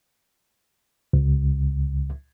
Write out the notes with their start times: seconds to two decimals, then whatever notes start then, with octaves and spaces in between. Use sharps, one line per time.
1.13 C#2